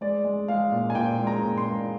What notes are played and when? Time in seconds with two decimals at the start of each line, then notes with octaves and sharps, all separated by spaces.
0.01 G#3 D5
0.24 G#3
0.48 G#3 F5
0.72 A#2
0.90 G#5
0.95 A#2 G5
1.19 G#3
1.27 A#5
1.43 A#2
1.58 C6
1.65 G#3